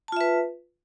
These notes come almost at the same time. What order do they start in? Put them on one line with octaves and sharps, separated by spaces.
A5 F4 E5 B4